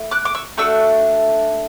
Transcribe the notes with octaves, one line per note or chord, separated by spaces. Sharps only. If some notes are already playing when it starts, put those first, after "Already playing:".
Already playing: A3 E4
D6 F#6
D6
C#6 E6
A3 D4 F#4 C#6 E6